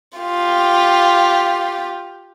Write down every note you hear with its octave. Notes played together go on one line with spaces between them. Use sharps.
F4 G4